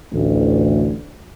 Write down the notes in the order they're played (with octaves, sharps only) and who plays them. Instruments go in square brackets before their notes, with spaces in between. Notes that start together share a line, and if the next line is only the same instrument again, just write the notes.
[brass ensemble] A1 D2